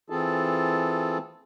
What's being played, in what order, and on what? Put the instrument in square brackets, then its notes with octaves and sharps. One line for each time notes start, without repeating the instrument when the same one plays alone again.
[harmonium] E3 C4 F4 G#4 A4 A5